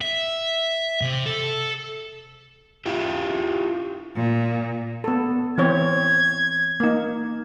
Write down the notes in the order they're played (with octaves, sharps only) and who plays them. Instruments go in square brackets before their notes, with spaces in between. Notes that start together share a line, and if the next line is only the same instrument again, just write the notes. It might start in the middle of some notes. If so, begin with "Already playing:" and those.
[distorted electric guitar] E5
C3
A4
[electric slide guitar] E4 F4 G4
[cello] A#2
[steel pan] B3 A4
[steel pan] E3 C4 C#5 [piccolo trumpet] G#6
[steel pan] A#3 D#4